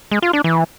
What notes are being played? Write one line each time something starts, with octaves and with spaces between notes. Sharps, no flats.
G#3
F4
D4
E3